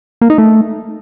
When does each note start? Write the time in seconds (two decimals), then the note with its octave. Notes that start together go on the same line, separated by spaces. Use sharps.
0.21 A#3
0.30 D#4
0.38 A3